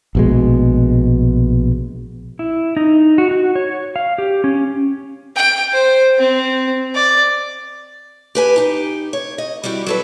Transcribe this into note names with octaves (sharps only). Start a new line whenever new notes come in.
A#1 B2 G#3
E4
D#4
F#4
F#4
C#5
F5
G4
C#4
G5
C5
C4
D5
G4 B4 G#5
D#4 G4
C#5
D#5
G3 E4 F#4 G4
F#3 A4 B4